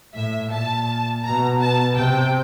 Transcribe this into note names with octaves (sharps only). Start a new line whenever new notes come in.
A2 E5
A#2 A5
B2 A#5
A5
C3 G5